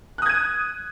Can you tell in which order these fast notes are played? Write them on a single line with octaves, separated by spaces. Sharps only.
F#6 D#6 G#6 D#7